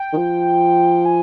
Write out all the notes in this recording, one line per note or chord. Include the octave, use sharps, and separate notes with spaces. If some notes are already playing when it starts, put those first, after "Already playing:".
Already playing: G5
D#3
F3
G#5